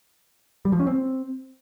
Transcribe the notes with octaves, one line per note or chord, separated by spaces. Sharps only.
G3
F3
C#4
C4